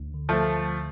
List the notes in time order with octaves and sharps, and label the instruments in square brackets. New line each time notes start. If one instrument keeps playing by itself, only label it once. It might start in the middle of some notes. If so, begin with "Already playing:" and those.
Already playing: [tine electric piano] D2
D3
[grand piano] F3 A3